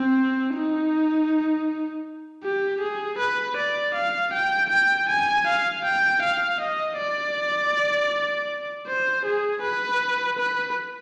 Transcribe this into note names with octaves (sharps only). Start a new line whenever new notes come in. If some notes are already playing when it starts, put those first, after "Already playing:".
Already playing: C4
D#4
G4
G#4
B4
D5
F5
G5
G5
G#5
F5
G5
F5
D#5
D5
C5
G#4
B4
B4